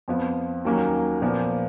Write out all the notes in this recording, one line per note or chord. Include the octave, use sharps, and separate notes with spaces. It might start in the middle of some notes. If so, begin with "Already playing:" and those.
F2 F3 B3
D#2 D#3 F#3 A#3 C#4
A#2 F3 B3